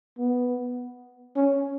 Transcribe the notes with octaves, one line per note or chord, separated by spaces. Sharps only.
B3
C#4